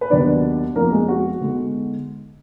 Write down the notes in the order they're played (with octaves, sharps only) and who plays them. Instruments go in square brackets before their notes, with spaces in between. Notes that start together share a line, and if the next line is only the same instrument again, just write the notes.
[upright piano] B4
[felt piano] D#2 D#3 F#3 B3 [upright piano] D4 D5
[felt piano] F2 F3 B3 D4 [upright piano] A#3 A#4
[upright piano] G#3 G#4
F#4
[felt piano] D3 G#3 B3 D#4